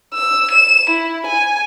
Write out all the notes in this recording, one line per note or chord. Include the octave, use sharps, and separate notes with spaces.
E6
E7
E4
G#5